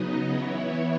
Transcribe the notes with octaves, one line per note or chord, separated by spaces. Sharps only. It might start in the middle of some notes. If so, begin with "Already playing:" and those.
Already playing: C#3 F#3 B3 D#4 D#5
E3 B3 E4 C#5